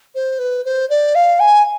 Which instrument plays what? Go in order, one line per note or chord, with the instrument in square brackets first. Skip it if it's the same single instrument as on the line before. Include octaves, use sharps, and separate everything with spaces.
[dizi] C5
B4
C5
D5
F5
G#5